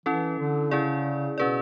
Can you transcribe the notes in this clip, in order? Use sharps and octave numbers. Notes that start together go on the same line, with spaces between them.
E3 C#4 E4 A4
D3
C#3 C#4 E4 G#4 D5
B2 C#4 G#4 B4 D5